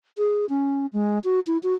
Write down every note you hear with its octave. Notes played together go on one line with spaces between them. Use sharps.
G#4
C#4
G#3
F#4
E4
F#4